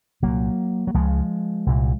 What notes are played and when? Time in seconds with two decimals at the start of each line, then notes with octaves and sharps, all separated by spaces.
0.22 C2 A#2 F#3 A#3
0.87 F#3
0.94 C#2 C#3 F3 G#3
1.66 C2 A#2